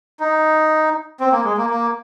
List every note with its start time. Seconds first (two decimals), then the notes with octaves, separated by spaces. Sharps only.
0.20 D#4
1.20 C4
1.32 A#3
1.44 G#3
1.57 A#3
1.69 A#3